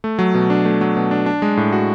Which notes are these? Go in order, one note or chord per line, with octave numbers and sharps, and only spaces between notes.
A3
F#3
B2
D4
A3
F#3
B2
D4
D4
G#3
A2
F#4